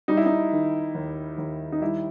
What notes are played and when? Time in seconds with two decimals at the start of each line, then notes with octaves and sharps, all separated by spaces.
0.08 G3 D#4
0.17 E4
0.26 D#4
0.52 D#3
0.94 D#2
1.38 D#2
1.72 D#4
1.81 G3 E4